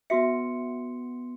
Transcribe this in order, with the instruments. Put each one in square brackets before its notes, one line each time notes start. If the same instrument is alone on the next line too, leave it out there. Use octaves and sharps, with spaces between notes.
[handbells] B3 C6 C#7 [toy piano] F#4 E5